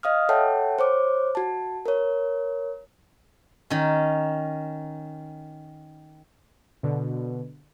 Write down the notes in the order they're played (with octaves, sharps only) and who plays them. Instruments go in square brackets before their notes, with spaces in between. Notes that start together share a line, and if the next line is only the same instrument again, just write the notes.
[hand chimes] D#5 F5 D#6 F6
A4 C#5 E5 F#5 G5 A5
C5 C#5 D6
F#4 A5
A#4 C#5
[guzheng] D#3 C#4
[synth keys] B2 D3